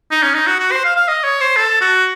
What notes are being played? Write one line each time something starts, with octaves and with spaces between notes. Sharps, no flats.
D#4
C#4
D#4
F#4
F#4
C5
F5
F5
D#5
C#5
C5
A4
F#4